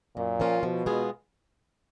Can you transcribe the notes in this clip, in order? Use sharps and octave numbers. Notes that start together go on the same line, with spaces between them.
F#2 A#2
F3 A#3 C#4 F4
B2 F3
G#3 B3 F4 G#4